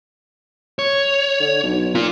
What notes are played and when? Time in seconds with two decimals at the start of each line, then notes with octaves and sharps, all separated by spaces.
0.79 C#5
1.40 D3
1.63 B1
1.95 A#2 F4 A#4